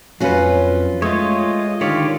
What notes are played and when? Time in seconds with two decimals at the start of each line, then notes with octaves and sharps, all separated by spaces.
0.20 F2 F#3 C#4 F4 F#4 B4
1.02 G#3 A3 F4 C#5 D#5 E5
1.81 D3 D#3 F4 G4 C#5 D5 F5